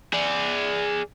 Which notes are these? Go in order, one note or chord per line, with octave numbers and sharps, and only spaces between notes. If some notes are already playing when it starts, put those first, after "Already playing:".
G#4 D5